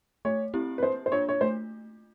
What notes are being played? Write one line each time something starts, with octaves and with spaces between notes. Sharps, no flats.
A3 C#5
C4 E4 G4
B4
A#3 C5
C5
D4 F4 C#5
C#5
A3 C5